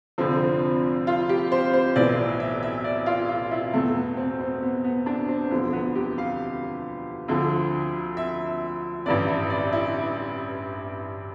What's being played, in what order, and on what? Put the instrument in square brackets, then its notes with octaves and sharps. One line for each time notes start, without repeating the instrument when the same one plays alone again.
[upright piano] F1 F2 D3 F3 C4
F4
G4
C5
C5
B1 A2 E3 D5
E5
E5
D5
F4
F4
E4
E2 B2 A3
B3
C4
C4
B3
B3
D4
C4
E1 D2 D3 F3 B3
B3
G4
F5
D2 D3 F3
E5
A1 G2 E3 D5
E5
D5
E4